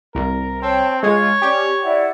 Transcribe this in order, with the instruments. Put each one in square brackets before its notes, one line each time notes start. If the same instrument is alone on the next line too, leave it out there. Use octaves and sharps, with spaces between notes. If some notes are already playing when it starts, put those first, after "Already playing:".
[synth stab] C2 [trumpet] A#4
[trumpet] C4 [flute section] C#5 G5 A5
[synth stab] G#3 [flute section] F4 G#6 [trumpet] C#5
[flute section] C#4 D5 [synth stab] G4
[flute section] E4 D5 F#5